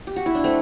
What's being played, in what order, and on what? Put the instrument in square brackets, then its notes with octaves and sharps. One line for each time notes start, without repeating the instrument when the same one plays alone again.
[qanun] G4
F#4
E4
D4
A3 C4